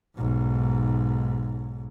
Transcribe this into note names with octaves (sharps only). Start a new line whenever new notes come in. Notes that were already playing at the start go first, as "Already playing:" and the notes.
B1 G#2